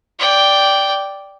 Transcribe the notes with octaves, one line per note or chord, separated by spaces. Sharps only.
D5 G5